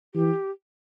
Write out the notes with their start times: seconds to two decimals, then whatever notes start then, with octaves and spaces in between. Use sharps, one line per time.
0.14 E3 G4